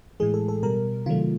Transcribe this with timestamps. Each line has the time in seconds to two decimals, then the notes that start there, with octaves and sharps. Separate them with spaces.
0.20 A2 E3 G#3 G#4
0.34 A4
0.48 A4
0.63 B2 G3 A#4
1.06 C3 D#3 F#3 A3 F4